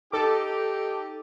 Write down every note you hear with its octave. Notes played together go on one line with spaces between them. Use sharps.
D#4 G4 A4 D6